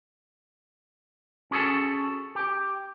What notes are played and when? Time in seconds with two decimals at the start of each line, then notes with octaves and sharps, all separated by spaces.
1.51 C#4 F#4 G#4 A4 A5
2.35 G4